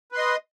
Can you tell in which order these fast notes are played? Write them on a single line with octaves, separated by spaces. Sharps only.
B4 C6 D#5